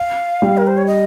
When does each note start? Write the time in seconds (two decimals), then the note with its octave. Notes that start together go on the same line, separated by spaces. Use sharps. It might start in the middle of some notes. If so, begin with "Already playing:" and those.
Already playing: F5
0.42 G3
0.57 A#4
0.67 C5
0.77 C#5
0.87 D#5